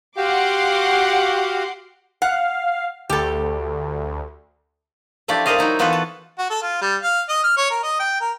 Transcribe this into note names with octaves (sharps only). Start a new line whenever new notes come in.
F#4 G4 F5 F#5 C6 D6
F5 F#5
D2 G4 A4
F3 A3 D4 E4 G4 D5
E4 A#4 C5 D5 D#5 F5
F#3 D#4 E4
E3 B3 F4 F#4 A4 B4
A5
F#4
A4
F4
G3
F5
D#5
F6
C#5
A#4
D#5
G5
A#4